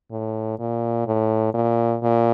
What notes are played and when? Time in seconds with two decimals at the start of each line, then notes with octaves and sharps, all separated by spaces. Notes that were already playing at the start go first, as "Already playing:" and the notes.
0.11 A2
0.59 A#2
1.07 A2
1.54 A#2
2.02 A#2